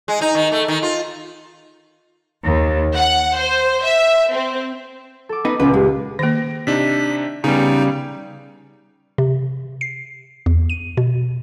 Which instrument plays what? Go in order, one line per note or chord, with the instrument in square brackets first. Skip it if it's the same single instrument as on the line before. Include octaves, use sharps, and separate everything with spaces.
[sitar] G#3
D#4
D#3
A3
D#3
F4
[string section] D#2
F#5
C5
E5
C4
[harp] A4 D6
[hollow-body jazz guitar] B3 D#4 B4
[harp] C#2 A#2 [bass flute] C#4 [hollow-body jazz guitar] B4
[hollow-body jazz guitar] G#3 [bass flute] G4
[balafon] D#3 A#3 [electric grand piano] A#6 D7
[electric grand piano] C3 D4 D#4 [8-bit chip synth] B6
[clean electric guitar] C#3 G3 [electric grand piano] B3 G#4 [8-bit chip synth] D#4
[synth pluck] C3
C7
E2
D#7
B2